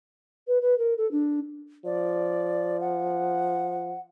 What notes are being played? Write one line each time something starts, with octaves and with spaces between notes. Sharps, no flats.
B4
B4
A#4
A4
D4
F3 D5
F#5